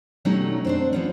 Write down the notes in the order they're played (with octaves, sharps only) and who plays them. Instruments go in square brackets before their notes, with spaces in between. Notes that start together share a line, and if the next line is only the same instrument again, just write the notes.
[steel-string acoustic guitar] B2 F#3 G3 A3 C#4 D#4
C4 D4 C5
F3 B3 C#4